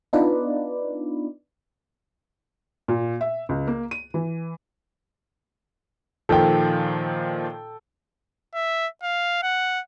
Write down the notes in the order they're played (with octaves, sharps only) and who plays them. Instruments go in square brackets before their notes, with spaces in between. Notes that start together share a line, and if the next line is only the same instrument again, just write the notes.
[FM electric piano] B3 D4 D#4 F4 B4 D5
[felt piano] A#2
E5
C#2
A#3
D#7
E3
[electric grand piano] A#2 D#3 F3 [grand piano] A4 G5
[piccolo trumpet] E5
F5
F#5